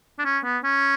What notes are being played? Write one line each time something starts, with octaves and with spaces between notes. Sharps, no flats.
D4
C#4
B3
C#4